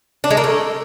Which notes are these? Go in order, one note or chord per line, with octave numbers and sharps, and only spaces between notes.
D4
G#3
A#3
A3